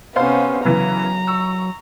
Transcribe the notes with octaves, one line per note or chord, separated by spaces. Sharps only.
C3 B3 C#4 C5 F5
C#3 E3 F#3 B3 A#5
C#6 E6